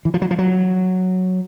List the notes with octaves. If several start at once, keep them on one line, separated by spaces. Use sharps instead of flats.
E3
F3
F#3
F3
F#3